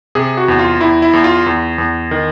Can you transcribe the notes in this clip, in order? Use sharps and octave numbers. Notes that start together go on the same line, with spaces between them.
C3 G#4
F#4
E2
F4
E2 E4
E4
E2
F4
E2
E2
D#3